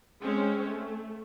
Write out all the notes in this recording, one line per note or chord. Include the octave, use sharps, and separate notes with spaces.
G#3 C4 C#4
A3